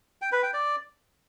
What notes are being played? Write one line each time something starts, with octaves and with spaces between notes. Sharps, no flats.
G5
B4
G5
D5